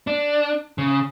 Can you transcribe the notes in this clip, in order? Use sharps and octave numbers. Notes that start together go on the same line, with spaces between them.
D4
C#3